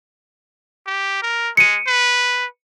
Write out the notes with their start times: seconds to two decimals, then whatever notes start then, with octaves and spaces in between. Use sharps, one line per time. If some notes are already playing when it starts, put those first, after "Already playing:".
0.86 G4
1.22 A#4
1.57 G#3 C#7 D#7
1.87 B4